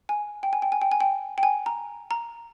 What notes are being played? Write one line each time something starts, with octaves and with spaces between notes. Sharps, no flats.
G#5
G5
G#5
G5
G#5
G5
G#5
G5
G5
G#5
A#5
A#5